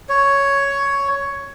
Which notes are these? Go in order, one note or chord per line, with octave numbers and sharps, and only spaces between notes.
C#5